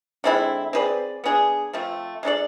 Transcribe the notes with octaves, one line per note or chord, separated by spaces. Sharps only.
D3 G#3 C4 E4
C4 G#4 B4 D5
B3 D4 G#4
F3 A3 C4
G#3 D4 A4 D5